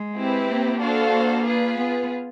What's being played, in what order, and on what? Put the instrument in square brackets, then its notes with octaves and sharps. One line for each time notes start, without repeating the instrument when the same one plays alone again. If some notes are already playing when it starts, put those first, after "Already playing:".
Already playing: [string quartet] G#3
[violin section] C4 E4 G4 B4
[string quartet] A#3
[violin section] D4 F#4 A4 C5 F5
[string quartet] A#3
[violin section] F4 G#4 B4
[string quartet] B3